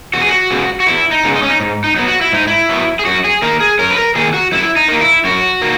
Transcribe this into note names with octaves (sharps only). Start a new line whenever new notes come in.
E2 F#4
G#4
F#4
C#3 G#3 B3
F#4
E2 E4
D#4
C#3 G#3 B3
D#4
C#4
D#4
G#2
D#4
F#3 B3
F#4
E4
G#2 D#4
E4
F#3 B3
G#4
F#2 F#4
G#4
D#3 A#3 A#4
G#4
F#2 A#4
B4
A#4
D#3 A#3 G#4
F#4
F#2 E4
D#4
D#3 A#3
E4
F#2 F#4
D#3 A#3